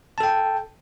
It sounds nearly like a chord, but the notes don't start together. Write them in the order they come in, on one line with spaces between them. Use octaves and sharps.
A5 A4 G5